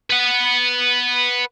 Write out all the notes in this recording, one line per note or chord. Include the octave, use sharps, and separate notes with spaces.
B4 F#5